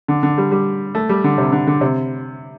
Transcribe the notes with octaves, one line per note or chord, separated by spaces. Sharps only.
D3
D3
G3
G3
A3
G3
D3
C3
D3
D3
C3